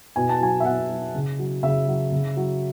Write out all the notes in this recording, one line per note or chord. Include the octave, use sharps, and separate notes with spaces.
B2 G#5
A5
F#3 G#5
E5
B2 F#5
F#3
C#3
F#3
C#3 E5
F#3
C#3
F#3